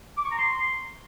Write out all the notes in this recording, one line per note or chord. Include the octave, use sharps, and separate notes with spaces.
D6
C#6
A#5
C6